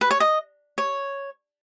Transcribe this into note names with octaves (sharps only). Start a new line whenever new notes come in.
B4
C#5
D#5
C#5